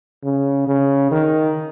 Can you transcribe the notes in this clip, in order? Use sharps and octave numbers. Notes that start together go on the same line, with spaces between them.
C#3
C#3
D#3